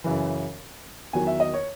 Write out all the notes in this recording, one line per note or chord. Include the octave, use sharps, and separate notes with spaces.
F#2 C#3 E3
E2 D#3 F#3 G#5
E5
D#5
C#5